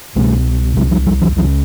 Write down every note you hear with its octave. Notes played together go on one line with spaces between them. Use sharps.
C2 B2 G3 A3
C2 C3 F#3 G#3
F3 G3
F3 G3
E3 F#3
C#2 C#3 E3 F#3